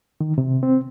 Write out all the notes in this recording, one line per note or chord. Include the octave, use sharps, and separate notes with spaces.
D#3
C3
C4